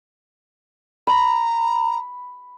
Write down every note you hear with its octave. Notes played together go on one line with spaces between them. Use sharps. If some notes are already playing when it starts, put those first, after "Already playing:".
A#5 B5